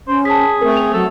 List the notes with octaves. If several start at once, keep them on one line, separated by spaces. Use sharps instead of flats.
C#4 C5
G#4 A5 B6
A3 C4 A#4
F7
F#3 A4